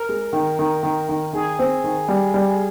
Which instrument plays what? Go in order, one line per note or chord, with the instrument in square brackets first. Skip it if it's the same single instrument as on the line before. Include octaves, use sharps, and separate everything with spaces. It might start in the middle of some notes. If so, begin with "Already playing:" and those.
Already playing: [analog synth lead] A#4
[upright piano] G#3
D#3
D#3
D#3
D#3
[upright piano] D#3 [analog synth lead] G#4
[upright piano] C4
D#3
G3
G3